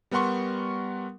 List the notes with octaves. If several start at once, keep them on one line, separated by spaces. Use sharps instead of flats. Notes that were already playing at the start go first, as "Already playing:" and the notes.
G3 B3 A#4 F#5 C6 C#6